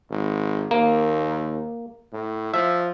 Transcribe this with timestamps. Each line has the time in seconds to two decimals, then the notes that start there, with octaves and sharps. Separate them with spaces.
0.10 G#1
0.71 D#2 A#3
2.13 A2
2.54 F3 E5